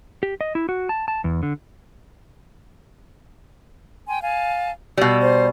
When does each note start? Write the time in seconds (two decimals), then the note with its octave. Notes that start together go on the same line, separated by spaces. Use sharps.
0.23 G4
0.41 D#5
0.55 E4
0.69 F#4
0.89 A5
1.08 A5
1.24 E2
1.43 D3
4.08 G5 G#5 C6
4.22 F5 G#5 A5
4.97 B2 G3 E6
5.21 C5